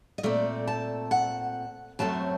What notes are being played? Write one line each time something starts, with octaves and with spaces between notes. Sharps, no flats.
D#5
A#2 A3 C4 D5
A5
F#5
F#2 F#3 A3 C4 A5